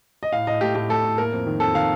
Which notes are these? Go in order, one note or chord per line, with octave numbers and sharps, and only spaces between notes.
D#5
A2 F5
A2 D#5
A3 G4
A2 G4
A3 A4
A2
A#3 A#4
F2
D#3
F2 A4
D#3 F5